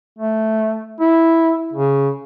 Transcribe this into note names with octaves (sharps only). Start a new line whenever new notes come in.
A3
E4
C#3